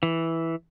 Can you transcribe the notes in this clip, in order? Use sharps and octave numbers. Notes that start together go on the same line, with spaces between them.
E3